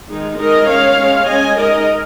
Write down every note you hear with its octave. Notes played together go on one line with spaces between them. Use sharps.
D#3 G#3 D#4
G#3 D#4 A#4 D#5
G#3 C#4 C#5 F5
G#3 C#4
G#3 C#4 D#5 G#5
G#3 D#4 A#4 D#5